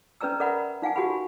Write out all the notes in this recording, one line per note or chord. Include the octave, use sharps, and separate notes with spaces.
C#4 B4 D5 A#5 E6
A#4 D5 E5 F#5 A#5 B5
D#4 F5 F#5 G#5
F#4 G4 F#5 G#5 B5
F#4